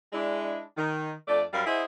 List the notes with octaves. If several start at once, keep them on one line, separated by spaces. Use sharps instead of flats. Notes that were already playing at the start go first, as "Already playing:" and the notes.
G#3 D4 E4
D#3
F2 A3 D4 D5
F#2 G3 A#4 F5
E4 G#4 C5 D#5 E5 F#5